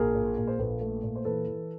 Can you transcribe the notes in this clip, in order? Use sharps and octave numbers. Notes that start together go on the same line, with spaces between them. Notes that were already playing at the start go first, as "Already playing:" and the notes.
Already playing: A#1 G#4 A#4
A#2
A#2
C5
A#1 A4 B4
A3
A#2
C5
E3 A4 B4
E3